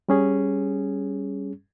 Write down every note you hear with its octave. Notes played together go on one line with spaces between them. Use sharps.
G3 C#4 G#4